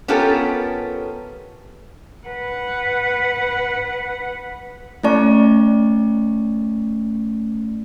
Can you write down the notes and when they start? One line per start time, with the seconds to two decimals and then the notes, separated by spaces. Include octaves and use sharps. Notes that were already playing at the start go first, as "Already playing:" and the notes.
0.08 B3 C#4 F4 G4 A4 A#4
2.27 B4 F#5
5.03 A3 C#4 E4 D5 A5 C#6